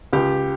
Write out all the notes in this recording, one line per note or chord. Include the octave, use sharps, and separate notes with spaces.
C#2 G4